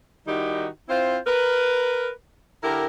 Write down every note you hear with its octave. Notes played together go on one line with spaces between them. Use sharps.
D#3 G3 D#4 E4 F#4 G4
C4 E4 F4 C5
A#4 B4
D3 E4 G4 A#4